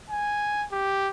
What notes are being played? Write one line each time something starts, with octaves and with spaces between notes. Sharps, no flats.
G#5
G4